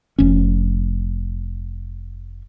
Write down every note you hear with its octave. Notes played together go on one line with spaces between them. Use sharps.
F1 C#4